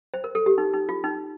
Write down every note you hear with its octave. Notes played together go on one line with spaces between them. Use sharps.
C5
A#4
A4
G4
D#4
D#4
F4
D#4